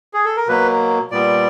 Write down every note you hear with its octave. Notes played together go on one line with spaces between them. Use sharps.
G#4
A4
A#4
B2 F#3 A#3 B4
A#2 G3 B3 D5